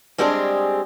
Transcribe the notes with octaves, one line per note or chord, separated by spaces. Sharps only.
G3 G#3 C4 D4 G4 G#4